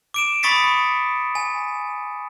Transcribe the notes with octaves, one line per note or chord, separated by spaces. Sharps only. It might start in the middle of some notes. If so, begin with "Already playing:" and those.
D6 D7 E7
B5 C#6 D#6 A6 B6 C#7
G#5